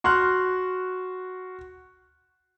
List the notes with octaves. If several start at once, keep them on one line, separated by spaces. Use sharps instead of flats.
F#4 C6 F6 F#6